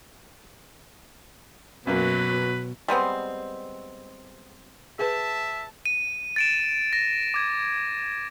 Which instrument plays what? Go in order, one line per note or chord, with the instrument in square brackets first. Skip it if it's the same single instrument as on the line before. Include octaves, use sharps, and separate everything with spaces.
[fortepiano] F#2 A#3 [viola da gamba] B2 [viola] F#3 [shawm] B4
[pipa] G3 G#3 B3 C4
[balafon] G#4 B4 [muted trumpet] E5 [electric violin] A5
[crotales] D#7
A6 D7 E7
A#6
D6 G#6